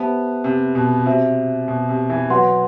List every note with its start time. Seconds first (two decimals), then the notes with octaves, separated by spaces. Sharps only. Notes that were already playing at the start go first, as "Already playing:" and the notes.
Already playing: B3 G4 C5 E5 A5
0.44 C3
0.75 B2
1.06 C3 F#4 C5 E5
1.68 B2
1.89 C3
2.10 E3
2.30 F#3 B4 F#5 C6